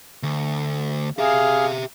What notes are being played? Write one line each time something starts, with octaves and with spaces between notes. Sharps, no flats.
D2
G4 G#4 E5 F5